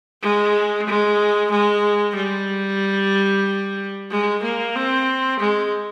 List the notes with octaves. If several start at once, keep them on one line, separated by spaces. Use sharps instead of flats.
G#3
G#3
G#3
G3
G#3
A#3
C4
G#3